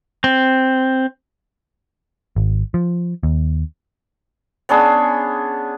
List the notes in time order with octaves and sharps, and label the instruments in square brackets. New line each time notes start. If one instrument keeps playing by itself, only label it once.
[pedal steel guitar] C4
[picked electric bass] G#1
F3
D#2
[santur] B3 C#4 D4 G#4